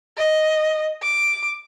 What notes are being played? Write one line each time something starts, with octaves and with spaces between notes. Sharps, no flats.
D#5
D6